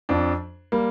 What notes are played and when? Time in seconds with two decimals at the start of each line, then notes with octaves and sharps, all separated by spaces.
0.09 F2 F3 D4
0.72 G3 A#3